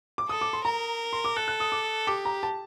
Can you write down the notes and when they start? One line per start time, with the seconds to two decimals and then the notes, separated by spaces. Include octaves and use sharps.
0.18 D6
0.29 A4 D#6
0.41 D6
0.53 C6
0.64 A#4 A#5
1.13 C6
1.25 D6
1.36 A4 F#6
1.48 F#6
1.60 D#6
1.72 D6
2.07 G4 D6
2.25 A#5
2.43 A5